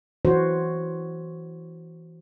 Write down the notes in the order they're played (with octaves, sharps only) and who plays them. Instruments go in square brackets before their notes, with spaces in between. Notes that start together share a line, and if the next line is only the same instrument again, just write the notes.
[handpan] E3 F#4 C5 C#5